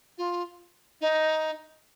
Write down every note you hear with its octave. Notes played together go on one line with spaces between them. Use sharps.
F4
D#4